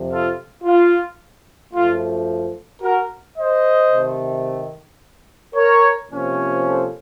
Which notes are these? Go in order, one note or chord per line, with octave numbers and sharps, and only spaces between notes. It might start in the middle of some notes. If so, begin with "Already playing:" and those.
Already playing: F2 C3 F3
F4 A4
F4
F#2 F3 A3 F4
F#4 A#4
C5 D#5
C3 D#3 A3
A#4 C#5
C3 F3 A#3 C#4
A4 C5